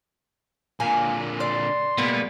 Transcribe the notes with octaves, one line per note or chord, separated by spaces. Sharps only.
A#2 D3 A#3 G#5
D5 C6
B2 G3 G#3 A#3 B3